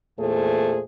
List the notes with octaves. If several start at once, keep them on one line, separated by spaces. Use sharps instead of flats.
E2 A#2 A3 G#4 C5